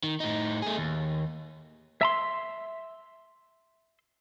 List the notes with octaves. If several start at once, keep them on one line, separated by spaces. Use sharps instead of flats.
D#3
A2 D#4
A3 G#4
D#2
E5 A#5 C6